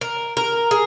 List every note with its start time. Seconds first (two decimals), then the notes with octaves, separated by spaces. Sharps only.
0.01 A#4
0.37 A#4
0.71 G#4